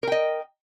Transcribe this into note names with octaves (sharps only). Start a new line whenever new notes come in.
A#4 D#5 G5